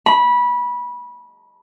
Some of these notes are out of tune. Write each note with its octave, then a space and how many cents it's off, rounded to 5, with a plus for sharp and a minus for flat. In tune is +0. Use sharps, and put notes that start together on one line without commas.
B5 -20